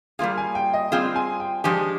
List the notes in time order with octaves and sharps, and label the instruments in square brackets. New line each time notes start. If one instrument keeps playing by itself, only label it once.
[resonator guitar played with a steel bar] G3 A#3 F4 G#4 [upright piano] F5
[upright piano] G#5
G5
D#5
[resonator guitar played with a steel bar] G3 C4 F4 G#4 [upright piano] F5
[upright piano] G#5
G5
[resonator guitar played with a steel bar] F3 G#3 D4 G4 [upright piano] G#5